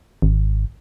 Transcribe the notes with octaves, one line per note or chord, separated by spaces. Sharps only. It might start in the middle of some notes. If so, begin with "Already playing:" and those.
G#1